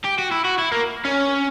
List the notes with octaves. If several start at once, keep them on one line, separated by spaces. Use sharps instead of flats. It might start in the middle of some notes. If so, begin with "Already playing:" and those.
G4
F#4
E4
F#4
E4
A#3
C#4